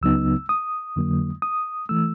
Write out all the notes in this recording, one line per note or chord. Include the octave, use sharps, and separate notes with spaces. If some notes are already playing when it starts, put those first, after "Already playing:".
C#2 C#3 F#3 B3 D#4 E6
D#6
F2 D3 F#3 A#3
D#6
E3 A3 E6